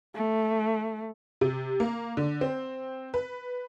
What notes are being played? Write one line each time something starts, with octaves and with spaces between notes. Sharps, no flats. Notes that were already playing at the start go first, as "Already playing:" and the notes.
A3
C3
A#3
D3
C4
B4